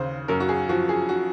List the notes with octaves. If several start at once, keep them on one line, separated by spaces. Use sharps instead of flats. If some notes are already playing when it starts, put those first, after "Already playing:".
Already playing: D#2 C#3 C5
F#2 A#4
F#4
G#4
F3 F#4
G#4
F#4